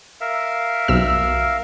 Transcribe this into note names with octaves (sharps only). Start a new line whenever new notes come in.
A#4 E5 F5
B1 E6